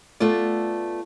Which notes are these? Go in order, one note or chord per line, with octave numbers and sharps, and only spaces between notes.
A3 B3 F4 D5